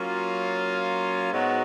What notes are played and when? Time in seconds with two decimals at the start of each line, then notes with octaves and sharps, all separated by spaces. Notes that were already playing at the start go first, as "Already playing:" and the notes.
Already playing: F#3 A#3 C#4 F4
1.32 G#2 F#3 B3 F#4